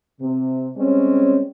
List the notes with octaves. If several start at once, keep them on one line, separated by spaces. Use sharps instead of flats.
C3
G3 G#3 C4 C#4